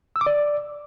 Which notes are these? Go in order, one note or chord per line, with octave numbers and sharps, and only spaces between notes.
E6
D6
D5